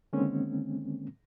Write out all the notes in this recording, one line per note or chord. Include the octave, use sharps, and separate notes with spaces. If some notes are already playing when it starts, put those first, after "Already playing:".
D3 D#3 G#3 A#3 C4 C#4